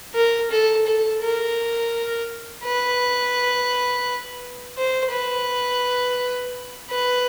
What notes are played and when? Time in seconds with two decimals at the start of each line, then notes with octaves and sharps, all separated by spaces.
0.15 A#4
0.51 A4
0.86 A4
1.22 A#4
2.63 B4
4.77 C5
5.12 B4
6.90 B4